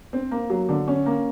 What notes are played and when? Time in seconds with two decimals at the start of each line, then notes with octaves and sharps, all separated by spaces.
0.13 C4
0.31 A#3
0.50 F#3
0.69 D3
0.88 C#4
1.06 A#3